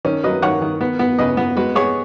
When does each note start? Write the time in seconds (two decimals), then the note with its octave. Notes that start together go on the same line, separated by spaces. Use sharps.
0.05 D#3 C#4
0.24 F#3 B4 D#5
0.42 D#3 C#5 F#5
0.61 D#3
0.81 B3
0.99 B3
1.18 C#3 B4 D#5
1.37 B3
1.56 G#3 F#4 B4
1.75 B3 G#4 C#5